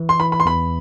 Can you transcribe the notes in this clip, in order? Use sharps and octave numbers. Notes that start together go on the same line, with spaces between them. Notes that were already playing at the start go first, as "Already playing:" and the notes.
Already playing: E3
C6
E3 B5
B5
C6
E2 B5